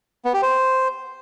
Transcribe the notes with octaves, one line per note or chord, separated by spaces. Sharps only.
B3
G4
C5